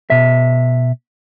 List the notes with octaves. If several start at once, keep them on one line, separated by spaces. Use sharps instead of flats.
B2 E5